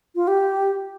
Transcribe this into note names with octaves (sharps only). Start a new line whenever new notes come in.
F4
G4